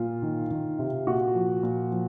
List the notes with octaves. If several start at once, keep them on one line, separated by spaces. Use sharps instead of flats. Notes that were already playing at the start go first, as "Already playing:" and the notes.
Already playing: A#2 F4
D#3
D#3
C3
A#2 F#4
F3
A#2
F3